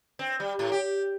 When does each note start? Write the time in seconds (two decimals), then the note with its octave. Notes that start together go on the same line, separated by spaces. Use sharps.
0.19 C4
0.40 G3
0.59 A2
0.72 G4